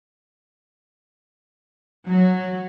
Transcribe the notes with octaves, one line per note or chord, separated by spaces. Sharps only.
F#3